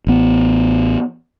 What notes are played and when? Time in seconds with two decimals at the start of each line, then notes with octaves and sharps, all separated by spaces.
0.07 A1 B3